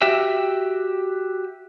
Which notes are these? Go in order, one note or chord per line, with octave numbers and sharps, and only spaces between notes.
F#4 G4 E5 G5